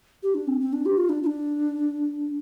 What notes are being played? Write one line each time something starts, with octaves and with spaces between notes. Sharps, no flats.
G4
D4
C4
C4
D4
G4
F4
D4
F4
D4